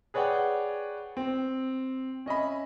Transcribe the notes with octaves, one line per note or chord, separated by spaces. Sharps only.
G#4 B4 C#5 D5 F#5 G5
C4
C#4 D#5 E5 B5